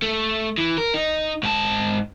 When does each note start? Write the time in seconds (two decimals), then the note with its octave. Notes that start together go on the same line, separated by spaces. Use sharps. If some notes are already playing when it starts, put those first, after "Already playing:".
0.02 A3
0.58 E3
0.78 A#4
0.94 D#4
1.43 G#2 A5